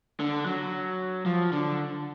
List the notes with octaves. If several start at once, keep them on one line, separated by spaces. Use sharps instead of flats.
D3
F#3
F3
D3